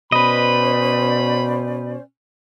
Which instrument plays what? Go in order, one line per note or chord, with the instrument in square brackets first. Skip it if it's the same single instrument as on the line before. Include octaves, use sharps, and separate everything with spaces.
[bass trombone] B2 [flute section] C#4 C5 D5 [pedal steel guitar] B4 D#5 [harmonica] B5